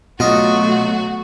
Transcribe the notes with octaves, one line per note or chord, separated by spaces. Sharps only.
B2 F#3 A3 F4 F#4 D#5